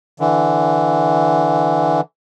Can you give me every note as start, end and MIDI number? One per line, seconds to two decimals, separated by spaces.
0.20 2.01 50
0.20 2.01 52